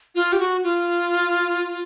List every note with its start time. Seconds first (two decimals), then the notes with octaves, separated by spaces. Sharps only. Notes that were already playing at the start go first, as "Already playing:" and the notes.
0.15 F4
0.33 G4
0.40 F#4
0.64 F4